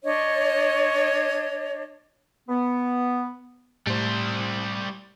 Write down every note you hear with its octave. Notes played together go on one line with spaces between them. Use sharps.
D4 C#5 D#5
B3
A2 G3 C5